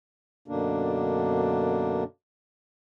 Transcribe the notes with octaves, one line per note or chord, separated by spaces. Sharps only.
F#2 B2 D3 A#3 D4